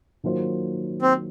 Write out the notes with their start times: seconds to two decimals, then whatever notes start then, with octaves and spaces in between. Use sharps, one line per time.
0.23 D#3 F#3 A#3 F4 C5
1.02 C4